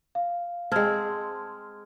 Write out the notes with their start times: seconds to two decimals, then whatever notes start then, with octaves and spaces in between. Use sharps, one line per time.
0.15 F5
0.72 G#3 C4 A5 F6 G#6